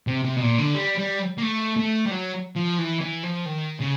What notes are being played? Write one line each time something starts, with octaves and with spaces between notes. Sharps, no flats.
C3
C3
B2
A#2
D3
G3
G3
A#3
A3
A3
G3
F#3
F3
E3
E3
F3
D#3
C#3